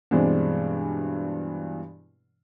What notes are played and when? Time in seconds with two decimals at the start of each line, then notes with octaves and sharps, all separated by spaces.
0.11 G2 B2 E3 G#3 C4 D4